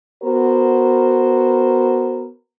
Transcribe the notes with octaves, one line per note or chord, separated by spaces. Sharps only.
B3 F#4 A#4 C5